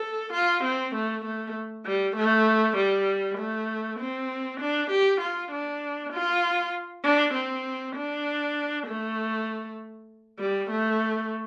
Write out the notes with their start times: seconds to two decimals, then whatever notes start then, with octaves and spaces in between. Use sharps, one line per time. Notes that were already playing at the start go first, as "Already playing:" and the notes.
Already playing: A4
0.33 F4
0.64 C4
0.95 A3
1.25 A3
1.86 G3
2.16 A3
2.77 G3
3.38 A3
4.00 C4
4.61 D4
4.91 G4
5.21 F4
5.51 D4
6.13 F4
7.04 D4
7.34 C4
7.96 D4
8.87 A3
10.39 G3
10.70 A3